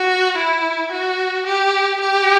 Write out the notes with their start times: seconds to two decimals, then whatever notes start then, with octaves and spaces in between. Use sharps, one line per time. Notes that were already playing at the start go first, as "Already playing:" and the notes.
Already playing: F#4
0.37 E4
0.91 F#4
1.46 G4
2.00 G4